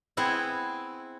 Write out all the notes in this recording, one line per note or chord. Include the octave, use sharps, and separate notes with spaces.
B3 C4 E4 G#4